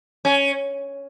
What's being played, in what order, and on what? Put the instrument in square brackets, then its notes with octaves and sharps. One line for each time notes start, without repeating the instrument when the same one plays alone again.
[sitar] C#4